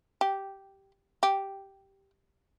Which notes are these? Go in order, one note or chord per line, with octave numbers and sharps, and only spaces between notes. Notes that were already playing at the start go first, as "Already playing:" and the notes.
G4
G4